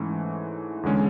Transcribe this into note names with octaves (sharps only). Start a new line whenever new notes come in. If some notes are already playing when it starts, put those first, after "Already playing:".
Already playing: G#2 E3 A3 C#4
E2 D3 G#3 C#4